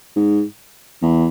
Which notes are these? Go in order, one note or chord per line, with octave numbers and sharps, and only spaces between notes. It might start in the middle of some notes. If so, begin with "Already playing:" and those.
G#2
E2